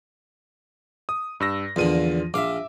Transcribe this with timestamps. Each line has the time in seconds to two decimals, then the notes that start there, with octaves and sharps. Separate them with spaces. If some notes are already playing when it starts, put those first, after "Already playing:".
1.09 D#6
1.40 G2 E6 A#6
1.76 E2 A#2 D3 F3 F4 D#7
2.34 A#1 E5 F5 D6